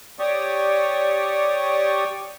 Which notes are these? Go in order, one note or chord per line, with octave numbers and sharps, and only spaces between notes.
G4 C#5 D5 G5 C#6 D#6